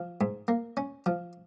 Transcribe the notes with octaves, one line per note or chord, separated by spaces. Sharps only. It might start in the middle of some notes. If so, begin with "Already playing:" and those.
Already playing: F3
G#2
A#3
C#4
F3